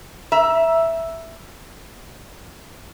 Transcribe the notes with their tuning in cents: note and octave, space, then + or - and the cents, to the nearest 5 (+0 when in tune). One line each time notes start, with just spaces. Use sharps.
E5 +0 A#5 +30